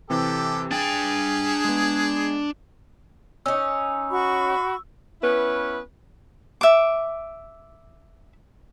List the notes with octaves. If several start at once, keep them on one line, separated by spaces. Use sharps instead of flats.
C3 E3 C4 G4 A4
D4 G#4 G5 A6
G#3 B3
C#4 D#4 E6
F#4 B5 C#6
B3 C#4 E4 B4
E5 D6